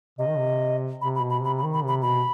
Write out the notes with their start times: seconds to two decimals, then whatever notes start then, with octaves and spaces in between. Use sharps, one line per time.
0.19 C3 D#5
0.29 D#3
0.38 C3
1.00 C3 B5
1.15 B5
1.21 B2
1.30 B5
1.42 C3 B5
1.58 B5
1.63 D#3
1.73 B5
1.84 C3 B5
2.02 B2 B5